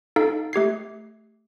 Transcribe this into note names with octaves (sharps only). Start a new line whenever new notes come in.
D#4 A4 F5
A3 G4 G#6 C7